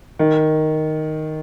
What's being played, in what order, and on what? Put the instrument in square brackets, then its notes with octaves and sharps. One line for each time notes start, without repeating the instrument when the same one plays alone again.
[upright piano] D#3